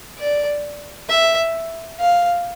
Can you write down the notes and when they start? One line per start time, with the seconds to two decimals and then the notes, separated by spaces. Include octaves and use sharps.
0.18 D5
1.09 E5
2.00 F5